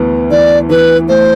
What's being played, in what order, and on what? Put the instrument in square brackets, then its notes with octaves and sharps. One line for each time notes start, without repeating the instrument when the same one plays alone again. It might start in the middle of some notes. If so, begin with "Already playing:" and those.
Already playing: [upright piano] D2 E3 B3
[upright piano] E3 [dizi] D5
[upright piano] E3 [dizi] B4
[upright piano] A3 [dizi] C5